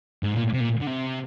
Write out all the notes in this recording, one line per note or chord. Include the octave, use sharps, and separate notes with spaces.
G#2
A#2
C3
A#2
D3
C3